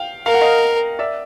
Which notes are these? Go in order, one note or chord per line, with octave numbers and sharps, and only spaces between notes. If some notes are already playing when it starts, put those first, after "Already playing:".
Already playing: F5 G5
A#4 F5
F#5
D#5 F5
D5 E5